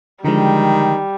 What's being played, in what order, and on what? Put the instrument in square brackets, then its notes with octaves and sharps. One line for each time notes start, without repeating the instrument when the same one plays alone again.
[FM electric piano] D3 F3 G#3 [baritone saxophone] D#3 [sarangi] G3